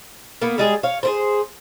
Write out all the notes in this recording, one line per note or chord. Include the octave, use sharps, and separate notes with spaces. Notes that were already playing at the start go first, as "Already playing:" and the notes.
A#3 B3
G3 G#3 G#4
C#5 F5
G#4 A#4 C5